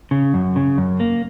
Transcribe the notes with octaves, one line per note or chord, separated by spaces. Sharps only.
C#3
F#2
C#3
F#2
A#3